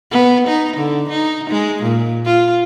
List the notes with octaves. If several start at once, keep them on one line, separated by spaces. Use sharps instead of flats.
B3
D#4
D3
D#4
G#3
A#2
F4